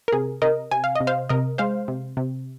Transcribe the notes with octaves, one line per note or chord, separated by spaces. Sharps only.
A#4
C3 G#4
C3 A#4 D#5
C3 G#5
F5
C3 D#5
C5 F5
C3 A#4 D#5
G#3 C5 F5
C3
C3